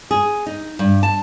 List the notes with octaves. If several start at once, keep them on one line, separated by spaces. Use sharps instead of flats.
G#4
D#4
G2
A5